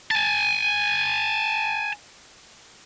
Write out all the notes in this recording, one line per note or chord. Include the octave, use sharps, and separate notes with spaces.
G#5 A5